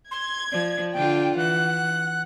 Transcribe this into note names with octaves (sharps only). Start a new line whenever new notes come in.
C6 G#6
F3 D5
D3 F4 G5
E3 F#5 F#6